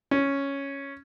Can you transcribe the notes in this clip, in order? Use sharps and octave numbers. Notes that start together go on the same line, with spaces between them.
C#4